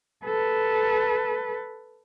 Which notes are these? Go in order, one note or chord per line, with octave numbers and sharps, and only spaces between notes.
A4 B4